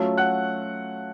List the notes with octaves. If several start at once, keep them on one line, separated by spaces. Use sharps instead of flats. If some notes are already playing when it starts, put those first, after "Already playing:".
Already playing: F#3 A3 C#4 F4
F#5 F#6